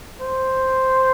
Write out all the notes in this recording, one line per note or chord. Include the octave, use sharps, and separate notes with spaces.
C5